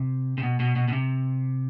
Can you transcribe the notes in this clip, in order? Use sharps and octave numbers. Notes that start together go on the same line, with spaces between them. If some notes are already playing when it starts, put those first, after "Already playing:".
Already playing: C3
C3
B2
B2
B2
B2
C3